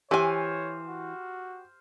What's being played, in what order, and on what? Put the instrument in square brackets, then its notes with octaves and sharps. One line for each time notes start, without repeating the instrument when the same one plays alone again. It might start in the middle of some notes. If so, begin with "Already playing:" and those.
[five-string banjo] E3 G#5 [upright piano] G4 [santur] C5 F5 [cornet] C#5
[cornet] F#4